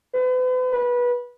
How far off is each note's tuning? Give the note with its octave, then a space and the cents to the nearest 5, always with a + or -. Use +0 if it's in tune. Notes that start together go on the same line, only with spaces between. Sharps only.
B4 +40
B4 -20